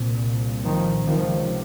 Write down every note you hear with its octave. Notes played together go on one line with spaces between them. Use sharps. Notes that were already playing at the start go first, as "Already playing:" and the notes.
Already playing: C2 A#2
D#3 F3
C#2 C3 D#3 F3